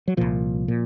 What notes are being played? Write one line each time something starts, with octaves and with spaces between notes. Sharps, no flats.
F#3
C2 A#2 F3
A#2